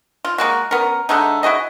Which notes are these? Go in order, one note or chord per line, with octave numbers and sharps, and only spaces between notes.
F4
G#3 A#3 F#4
B3 C#4 A#4
D3 G#3 A3 D#4
E4 F#4 G#4 D#5